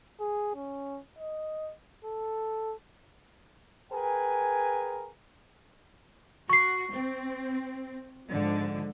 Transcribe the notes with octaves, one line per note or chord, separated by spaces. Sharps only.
G#4
C#4
D#5
A4
G#4 A#4 B4 G5 G#5
F#4 C#6 C7
C4
G#2 D3 F3